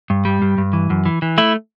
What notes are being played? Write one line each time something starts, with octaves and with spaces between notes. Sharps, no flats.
G2
G3
G2
G2
E3
F#2
E3
E3
A3 E4